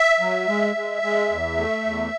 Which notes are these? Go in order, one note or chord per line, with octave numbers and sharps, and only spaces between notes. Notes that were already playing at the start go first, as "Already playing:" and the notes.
Already playing: E5
F#3
G#3
G#3
G#3
E2
A3
E2